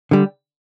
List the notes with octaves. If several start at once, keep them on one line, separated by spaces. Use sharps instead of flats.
D3 G3